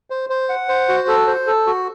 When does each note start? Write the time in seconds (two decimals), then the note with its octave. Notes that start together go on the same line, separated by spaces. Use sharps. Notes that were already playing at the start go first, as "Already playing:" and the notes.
0.10 C5
0.30 C5
0.49 F#5
0.68 C5
0.89 F#4
1.08 A4
1.27 C5
1.47 A4
1.67 F#4